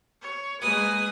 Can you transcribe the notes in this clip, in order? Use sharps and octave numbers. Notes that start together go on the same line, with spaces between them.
C#5
G#3 A#3 B4 G#5 D#6